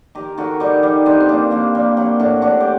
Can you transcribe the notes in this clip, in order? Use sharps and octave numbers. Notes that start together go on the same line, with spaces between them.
D#3 G4 A#4
D#3 F#4 A4
G3 D#4 G4
G3 D#4 G4
G2 C4 D#4
C4
G3 A#3 D4
G2 A#3
G3 A#3
F#3
A2 D4 F#4
A2 D4 F#4
G4